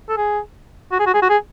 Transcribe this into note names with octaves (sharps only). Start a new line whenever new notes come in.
A4
G#4
F#4
G#4
F#4
G#4
F#4
G#4